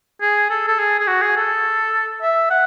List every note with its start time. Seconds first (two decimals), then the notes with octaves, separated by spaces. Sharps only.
0.22 G#4
0.50 A4
0.68 A4
0.79 G#4
0.99 G#4
1.07 F#4
1.22 G#4
1.36 A4
2.22 E5
2.50 F#5